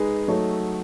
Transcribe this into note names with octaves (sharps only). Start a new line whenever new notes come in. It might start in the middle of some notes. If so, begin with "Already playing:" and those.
Already playing: G#3 D#4 G#4 B4
F#3 A3 D#4 A4 C#5